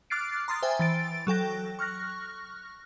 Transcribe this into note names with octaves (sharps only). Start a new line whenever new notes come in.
D6 F6 F#6 A6 C7 D7
A#5 C6 D#6 F6 A6
C5 E5 G5 G#5
E3 A6 D7
F#3 A4 G5 A#6
C#6 F6 F#6 A#6